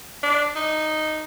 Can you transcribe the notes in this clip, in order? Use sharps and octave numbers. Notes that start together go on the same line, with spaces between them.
D4
D#4